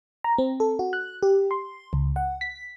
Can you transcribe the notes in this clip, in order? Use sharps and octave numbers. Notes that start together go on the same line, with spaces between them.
A#5
C4
A4
F#4
F#6
G4
C6
C#2
F#5
B6